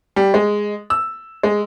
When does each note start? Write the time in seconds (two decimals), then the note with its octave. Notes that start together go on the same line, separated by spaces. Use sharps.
0.16 G3
0.34 G#3
0.90 E6
1.43 G#3